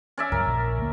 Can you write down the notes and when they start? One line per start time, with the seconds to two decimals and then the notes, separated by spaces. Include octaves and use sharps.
0.18 C#4 D5 E5
0.32 C#2 G2 F#3 A#4
0.47 A#1
0.78 D2 A#3